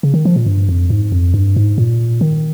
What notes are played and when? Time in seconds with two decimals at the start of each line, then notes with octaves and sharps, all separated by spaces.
0.03 C#3
0.14 D#3
0.25 F3
0.36 A#2
0.46 G2
0.69 F2
0.90 G#2
1.12 F2
1.34 G2
1.56 G#2
1.78 A#2
2.21 D#3